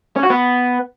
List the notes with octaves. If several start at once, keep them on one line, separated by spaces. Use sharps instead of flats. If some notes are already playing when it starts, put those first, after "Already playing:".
C#4
F#4
B3